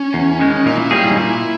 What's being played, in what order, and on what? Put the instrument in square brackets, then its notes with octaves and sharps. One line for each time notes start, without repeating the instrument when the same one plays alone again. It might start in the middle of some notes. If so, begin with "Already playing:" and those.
Already playing: [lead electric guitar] C#4
[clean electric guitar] E2
D#3 G#3
[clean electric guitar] A#2 [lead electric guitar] D#4
[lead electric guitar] E4
[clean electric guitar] G3 A#3 C#4 G#4 [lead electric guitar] G4
[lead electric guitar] E4
D#4
[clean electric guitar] A#2 [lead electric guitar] E4